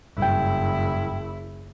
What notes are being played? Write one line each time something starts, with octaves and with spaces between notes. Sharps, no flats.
F#1 G2 E4 G5